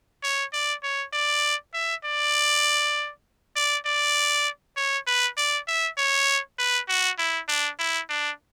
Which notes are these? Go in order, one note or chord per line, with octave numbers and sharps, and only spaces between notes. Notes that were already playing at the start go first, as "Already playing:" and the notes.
C#5
D5
C#5
D5
E5
D5
D5
D5
C#5
B4
D5
E5
C#5
B4
F#4
E4
D4
E4
D4